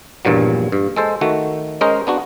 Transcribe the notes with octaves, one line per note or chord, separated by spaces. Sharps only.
A#1 E2 G2 A#2 F#3
G2
G#3 A4 C5
D#3 A3 F#4
G#3 C#4 A#4 C5 D#5
B3 D4 F#4